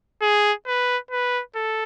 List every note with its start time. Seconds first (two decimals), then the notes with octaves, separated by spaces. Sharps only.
0.22 G#4
0.67 B4
1.11 B4
1.55 A4